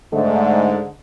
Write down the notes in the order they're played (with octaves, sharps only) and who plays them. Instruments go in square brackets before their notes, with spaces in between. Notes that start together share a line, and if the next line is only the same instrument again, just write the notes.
[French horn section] G#2 D3 [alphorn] A3